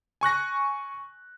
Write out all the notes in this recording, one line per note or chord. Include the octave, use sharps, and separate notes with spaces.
G#5 C#6 F#6 A#6